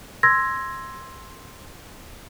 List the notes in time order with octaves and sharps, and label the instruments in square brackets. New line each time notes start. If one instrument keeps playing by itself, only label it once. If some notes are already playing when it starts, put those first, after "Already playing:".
[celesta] C6 E6 G#6 A#6